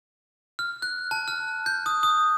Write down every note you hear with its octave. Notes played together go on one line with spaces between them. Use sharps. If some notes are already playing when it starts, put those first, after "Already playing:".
F6
F#6
A5
F6
G6
D#6
D#6